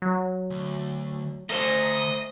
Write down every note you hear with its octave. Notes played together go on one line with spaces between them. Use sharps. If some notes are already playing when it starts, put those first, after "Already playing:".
F#3
D2
D2 A3 A4 C5 D#5 A#5